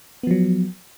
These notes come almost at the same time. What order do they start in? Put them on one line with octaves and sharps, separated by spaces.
B3 F3 F#3